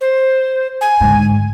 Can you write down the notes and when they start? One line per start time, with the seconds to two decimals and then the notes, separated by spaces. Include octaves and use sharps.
0.01 C5
0.81 G#5
1.01 G#2 D3